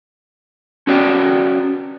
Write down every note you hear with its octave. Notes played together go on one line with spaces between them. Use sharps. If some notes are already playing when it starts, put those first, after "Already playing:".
C#4 F#4 D5 G5